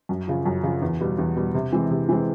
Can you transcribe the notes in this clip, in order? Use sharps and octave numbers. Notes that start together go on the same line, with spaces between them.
F#2
C#3 F3
F#2
C#3 F3
E2
B2 G3
E2
B2 G3
C3
E3 G#3 C4
C3
E3 G#3 C4